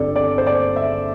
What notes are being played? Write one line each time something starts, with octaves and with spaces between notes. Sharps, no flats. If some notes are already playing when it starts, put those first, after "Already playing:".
Already playing: G1 G2 G3 C4 A4 D5
D5
C5
D5
E5